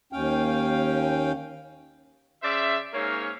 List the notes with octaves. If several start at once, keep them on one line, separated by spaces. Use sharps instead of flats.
D#2 C#4 F5 G5
C#3 C5 D5 E5
G#2 A#3 C#4 C#5